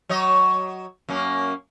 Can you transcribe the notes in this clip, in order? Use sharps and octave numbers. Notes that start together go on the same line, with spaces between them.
F#3 C#5 D#5
F#2 A#3 C#4